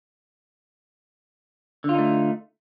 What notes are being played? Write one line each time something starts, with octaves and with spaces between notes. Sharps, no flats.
D3 A3 D#4 F4